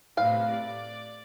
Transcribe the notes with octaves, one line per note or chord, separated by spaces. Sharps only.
A2 C3 B4 F5
D5